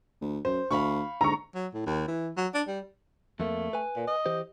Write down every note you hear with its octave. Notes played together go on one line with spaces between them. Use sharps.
D2
F#2 C5
D2 F5 B5 C#6
G#2 D3 A#5 C#6
F#3
A2
D#2
E3
F#3
D4
G3
F2 A3 A#3
B4 G#5
A#2
D#5
E3 G4 C5